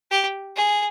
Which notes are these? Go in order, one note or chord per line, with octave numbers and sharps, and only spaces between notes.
G4
G#4